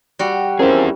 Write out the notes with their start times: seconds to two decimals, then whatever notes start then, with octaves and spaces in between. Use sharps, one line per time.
0.19 G3 F#4
0.59 F3 C4 C#4 E4 G#4 A#4